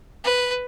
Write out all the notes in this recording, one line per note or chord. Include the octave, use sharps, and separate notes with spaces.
B4